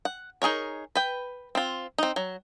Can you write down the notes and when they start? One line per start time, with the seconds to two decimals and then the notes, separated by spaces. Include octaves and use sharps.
0.05 F#5
0.42 D#4 G#4 A#4 C#5
0.95 B4 G5
1.55 C4 F4
1.98 C4 D#4
2.16 F#3